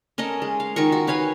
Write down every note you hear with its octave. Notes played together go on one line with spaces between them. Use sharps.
C#4 A4 A#4 D#5
G#3
F5
D#3 F4 A#4 C#6
F#4
B4 C#5 F5 G#5